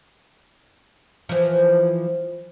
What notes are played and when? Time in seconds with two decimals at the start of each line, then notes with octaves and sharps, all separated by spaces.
1.29 E3 F3